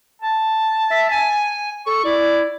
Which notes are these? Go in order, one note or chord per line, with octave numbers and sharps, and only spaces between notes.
A5
E5
G#5
A4 C#6
E4 D5